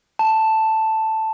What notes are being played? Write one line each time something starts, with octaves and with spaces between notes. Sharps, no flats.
A5